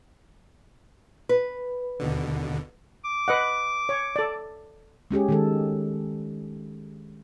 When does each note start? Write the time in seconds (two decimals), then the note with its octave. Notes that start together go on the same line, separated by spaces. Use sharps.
1.29 B4
2.00 D#2 B2 D3
3.04 D6
3.28 B4 D#5 F#5
3.89 C#5
4.16 A4 D5
5.11 G#3 C#4 G4 G#4
5.29 D#3 G#3 A4